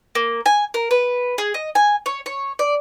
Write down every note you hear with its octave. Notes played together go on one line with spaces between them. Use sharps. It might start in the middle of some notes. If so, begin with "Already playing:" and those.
A#3
G#5
A#4
B4
G#4
D#5
G#5
C#5
C#5
D5